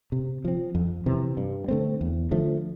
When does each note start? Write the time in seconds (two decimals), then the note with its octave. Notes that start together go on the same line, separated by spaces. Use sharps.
0.12 C3
0.45 F3 C4
0.75 F2
1.06 C3 E3
1.37 G2
1.68 D3 A3 C4
2.01 E2
2.31 D3 F3 A3